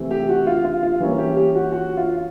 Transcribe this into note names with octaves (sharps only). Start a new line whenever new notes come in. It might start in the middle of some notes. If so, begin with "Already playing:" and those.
Already playing: C3 E3 A3 C4
G4
F#4
F4
F4
F4
E3 G3 A#3 C#4
G4
G4
F#4
F#4
F4